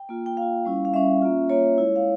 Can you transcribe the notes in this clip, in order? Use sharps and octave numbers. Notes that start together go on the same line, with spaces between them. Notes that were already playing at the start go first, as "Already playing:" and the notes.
Already playing: G5
A#3 F4
G5
A#3 F4 F5
G3 C#4 E4
F5
G3 C#4 E4 E5
A#3 C#4 F4
A#3 C#4 F4 C#5
G#3 E4
F5